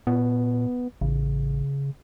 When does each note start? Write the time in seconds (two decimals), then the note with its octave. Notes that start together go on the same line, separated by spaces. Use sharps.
0.07 A#2 B3
1.01 A1 C#3